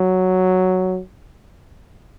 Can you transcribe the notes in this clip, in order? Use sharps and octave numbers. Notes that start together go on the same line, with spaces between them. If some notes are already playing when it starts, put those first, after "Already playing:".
Already playing: F#3